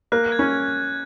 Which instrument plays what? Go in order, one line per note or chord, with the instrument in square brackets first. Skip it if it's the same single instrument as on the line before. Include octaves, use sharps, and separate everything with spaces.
[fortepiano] A#3 [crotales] F#6
[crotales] G#6
[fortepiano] C#4